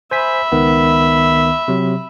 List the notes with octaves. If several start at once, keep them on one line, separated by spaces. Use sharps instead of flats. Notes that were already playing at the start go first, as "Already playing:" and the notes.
C5 E5 G#5 B5 B6
C#2 D#3 B3
C3 F#3